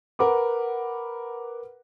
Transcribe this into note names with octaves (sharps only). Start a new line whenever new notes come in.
A#4 B4 F#5 D6